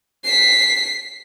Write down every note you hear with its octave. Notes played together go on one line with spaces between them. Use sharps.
B6 C7